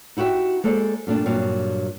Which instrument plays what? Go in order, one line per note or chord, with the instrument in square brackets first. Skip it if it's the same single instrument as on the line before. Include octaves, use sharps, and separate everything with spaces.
[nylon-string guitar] D#4 E4 F#4 G4 E5
G#3 A#3 A4 C5 D5
G2 A#2 A3 D4
G2 A#2 F#3